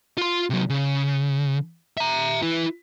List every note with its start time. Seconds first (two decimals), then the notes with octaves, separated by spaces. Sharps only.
0.17 F4 C6
0.50 C3 F#3
0.70 C#3
1.97 E5 A#5
2.42 E4 B4